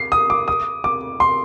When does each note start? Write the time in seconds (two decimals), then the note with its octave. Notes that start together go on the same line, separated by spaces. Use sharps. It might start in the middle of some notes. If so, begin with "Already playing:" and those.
Already playing: C7
0.12 D#6
0.30 D6
0.48 D#6
0.84 D6
1.20 C6